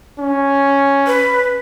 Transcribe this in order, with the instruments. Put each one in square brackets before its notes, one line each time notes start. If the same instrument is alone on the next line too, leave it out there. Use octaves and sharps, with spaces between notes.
[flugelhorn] C#4
[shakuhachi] B4